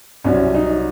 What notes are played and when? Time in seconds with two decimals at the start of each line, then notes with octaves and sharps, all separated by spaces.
0.24 C2 C3 F#3 C#4
0.55 D#4